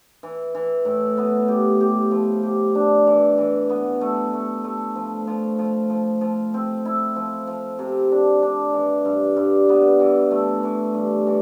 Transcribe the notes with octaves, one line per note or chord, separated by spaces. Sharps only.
E3
E3
A2
B3
G4
G4
F3
G4
D4
E3
E3
B3
A3
A3
A3
F3
F3
F3
F3
F3
C4
E4
F3
F3
C3
D4
D4
E3
G2
G2
B3
E3
A3
E3
G2
E3